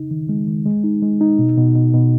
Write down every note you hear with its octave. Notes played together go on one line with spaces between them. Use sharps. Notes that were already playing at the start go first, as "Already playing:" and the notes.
Already playing: C#3 D#4
D#3
G#3
D#3
G#3
D#4
G#3
D#4
B2
B2
B2
B2